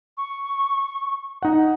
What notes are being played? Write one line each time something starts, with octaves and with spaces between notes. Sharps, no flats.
C#6
D#4 F#5